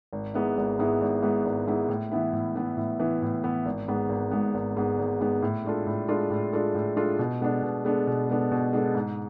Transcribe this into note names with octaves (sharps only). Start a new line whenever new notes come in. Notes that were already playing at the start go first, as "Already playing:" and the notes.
G#1
G#2 G#3 B3 E4
G#1
G#2 G#3 B3 E4
G#1
G#2 G#3 B3 E4
G#1
G#2 G#3 B3 E4
A2
E3 B3 E4
A2
E3 B3 E4
A2
E3 B3 E4
A2
E3 B3 E4
G#1
G#2 G#3 B3
G#1
G#2 G#3 B3
G#1
G#2 G#3 B3
G#1
G#2 G#3 B3
A2
G#3 D4 F4 A4
A2
G#3 D4 F4 A4
A2
G#3 D4 F4 A4
A2
G#3 D4 F4 A4
B2
G#3 B3 D4 A4
B2
G#3 B3 D4 A4
B2
G#3 B3 D4 A4
B2
G#3 B3 D4 A4
G#2